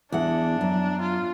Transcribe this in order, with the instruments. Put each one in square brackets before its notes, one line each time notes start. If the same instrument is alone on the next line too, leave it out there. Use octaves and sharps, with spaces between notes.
[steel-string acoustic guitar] E2 F#5 [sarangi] D4
[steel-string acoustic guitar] F#2
[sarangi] F4